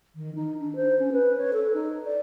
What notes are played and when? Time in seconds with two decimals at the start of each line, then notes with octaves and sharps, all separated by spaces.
0.15 D#3
0.35 D#4
0.59 D4
0.75 C5
0.99 C#4
1.12 B4
1.37 C#5
1.53 A4
1.73 D#4
2.05 D5